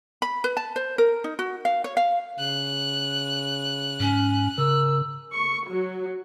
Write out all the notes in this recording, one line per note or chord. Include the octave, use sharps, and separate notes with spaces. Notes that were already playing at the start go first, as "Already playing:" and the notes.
B5
B4
A5
C5
A#4
D#4
F#4
F5
C#5
F5
C#3 F#6
G#2 C#4
C#3 A#4 E6
C#6
F#3